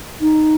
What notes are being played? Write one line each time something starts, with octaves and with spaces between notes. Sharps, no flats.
D#4